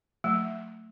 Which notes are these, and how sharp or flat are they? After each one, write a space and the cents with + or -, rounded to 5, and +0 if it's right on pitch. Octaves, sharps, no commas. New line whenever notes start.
F#3 -20 A3 +15